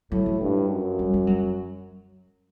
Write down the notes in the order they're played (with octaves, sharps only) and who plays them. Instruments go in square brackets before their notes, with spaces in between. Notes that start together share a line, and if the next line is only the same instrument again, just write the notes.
[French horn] A2 [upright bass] F#3
[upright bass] F#3
[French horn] G2
F#2
[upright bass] G3
G3
F#3